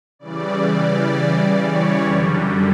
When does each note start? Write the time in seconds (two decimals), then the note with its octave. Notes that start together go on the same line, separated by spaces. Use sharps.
0.19 C#3 E3 G3 D5
1.57 C#5
2.03 F#2 D3 G3